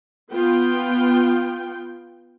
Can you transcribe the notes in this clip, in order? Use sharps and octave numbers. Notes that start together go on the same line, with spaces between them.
B3 F4 G5